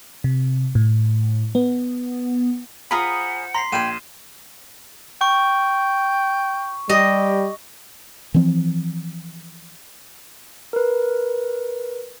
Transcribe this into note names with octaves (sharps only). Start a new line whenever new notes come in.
C3
A2
B3
F4 G#4 C5 F#5 A#5 B5 D#6
A#5 C6 B6 C7
A#1 G5 B5 C6 G#6 D#7 E7
G5 C#6
G3 G4 D#5
E3 F3 C4
A#4 B4